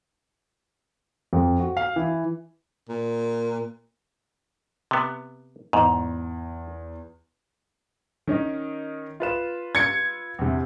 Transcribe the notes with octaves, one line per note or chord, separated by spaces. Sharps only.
F2
F#4
F5
E3
A#2
C3 B3
E2 G#2
D#3 C#4 D#4
F4 B4 E7
G#6 C#7
E2 C3